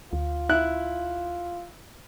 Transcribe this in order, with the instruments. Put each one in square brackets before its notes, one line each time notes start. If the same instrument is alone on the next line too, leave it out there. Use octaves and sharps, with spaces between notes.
[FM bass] D2 [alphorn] F4
[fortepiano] E4 F#6